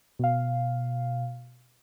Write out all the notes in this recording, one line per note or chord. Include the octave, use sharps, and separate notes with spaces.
B2 F5